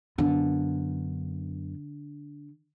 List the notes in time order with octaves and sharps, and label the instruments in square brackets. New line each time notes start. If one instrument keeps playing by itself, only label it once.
[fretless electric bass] F#2 B3 [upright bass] D3